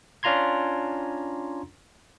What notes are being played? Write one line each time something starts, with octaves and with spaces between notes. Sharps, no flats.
C#4 D4 F4 A#5 C6 G#6